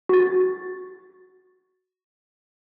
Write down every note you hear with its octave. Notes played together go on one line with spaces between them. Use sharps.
F#4 A6